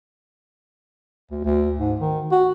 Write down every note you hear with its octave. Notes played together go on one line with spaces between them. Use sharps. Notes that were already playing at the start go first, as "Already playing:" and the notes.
D2
D2
G#2
D#3
F#4